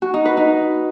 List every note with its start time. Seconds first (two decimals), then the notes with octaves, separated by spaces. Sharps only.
0.02 F#4
0.14 D#4
0.25 B4
0.37 D#4